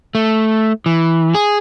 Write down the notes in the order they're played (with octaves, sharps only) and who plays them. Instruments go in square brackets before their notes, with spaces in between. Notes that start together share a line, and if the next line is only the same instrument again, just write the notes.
[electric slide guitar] A3
E3
G#4